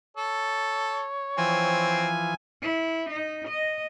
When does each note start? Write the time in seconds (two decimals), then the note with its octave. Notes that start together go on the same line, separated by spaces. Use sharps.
0.17 A4 C#5
1.38 E3 F3 C4 G#5
2.62 E4
3.10 D#4
3.48 D#5